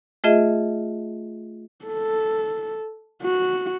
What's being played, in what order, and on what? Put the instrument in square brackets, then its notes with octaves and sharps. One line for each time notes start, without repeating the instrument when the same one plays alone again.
[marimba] A3 F4 G#4 D#5 E5
[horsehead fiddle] A4
F#4